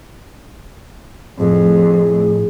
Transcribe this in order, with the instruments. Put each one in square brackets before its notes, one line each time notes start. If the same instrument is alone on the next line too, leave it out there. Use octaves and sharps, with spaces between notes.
[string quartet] F2 [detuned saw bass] A2 [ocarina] G#4